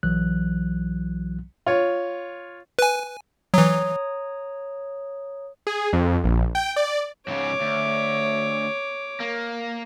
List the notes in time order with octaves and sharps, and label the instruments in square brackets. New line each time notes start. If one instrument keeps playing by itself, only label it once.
[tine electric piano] B1 E3 F#3 F#6
[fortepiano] F4 C#5
[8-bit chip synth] B4 G#5
[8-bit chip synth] E3 F#3 [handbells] C#5 A#5 D#6
[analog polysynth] G#4
F2
A#1
G5
D5
[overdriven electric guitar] G#2 C#3 [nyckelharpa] C#5 D6
[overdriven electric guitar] D2
A#3